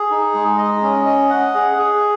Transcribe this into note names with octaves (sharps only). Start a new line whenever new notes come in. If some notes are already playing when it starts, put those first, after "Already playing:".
Already playing: G#4
D#4
G#3
D#5
C#4
D#5
F#5
G#4
G#4